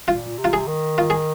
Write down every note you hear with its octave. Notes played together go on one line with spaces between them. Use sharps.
A#2 F4
C3
F4
G#4
D#3
F4
G#4